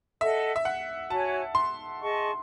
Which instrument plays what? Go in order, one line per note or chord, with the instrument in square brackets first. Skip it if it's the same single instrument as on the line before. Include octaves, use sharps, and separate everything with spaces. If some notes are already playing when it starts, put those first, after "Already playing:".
[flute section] A4 D#5 F#5 [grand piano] E5
[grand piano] E5
F#5
[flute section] F#4 C#5 G#5 [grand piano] A5
[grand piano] C6
[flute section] G#4 D#5 A5 C#6